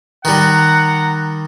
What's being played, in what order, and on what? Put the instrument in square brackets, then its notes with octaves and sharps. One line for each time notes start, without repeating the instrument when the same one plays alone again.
[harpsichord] D#3 G3 [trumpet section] F#5 A#5